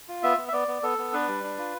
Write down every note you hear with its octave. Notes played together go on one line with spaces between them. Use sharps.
F4
B3 E5
B3
E5
B3 D5
B3
B3 A4
B3
D4 B4
G3
D4
F4